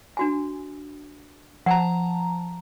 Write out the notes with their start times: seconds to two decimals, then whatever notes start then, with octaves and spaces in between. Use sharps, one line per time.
0.17 D4 F#4 G#5
1.66 F3 F#5 A5 A#5